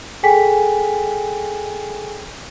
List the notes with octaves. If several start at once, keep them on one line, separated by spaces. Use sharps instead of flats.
G#4 A4 G5 G#5 B6